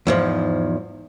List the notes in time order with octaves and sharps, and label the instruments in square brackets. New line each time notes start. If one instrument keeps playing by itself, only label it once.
[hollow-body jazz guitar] E2 G#2 F3